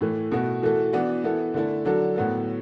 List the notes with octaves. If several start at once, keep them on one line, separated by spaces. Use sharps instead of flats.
A2 E3 A3
B2 A3 F#4
E3 A3 F#4 A4
E3 B3 D4 F#4
E3 B3 E4 A4
D3 A3 E4 A4
D3 F#3 D4 A4
A2 F#3 B3 F#4 A4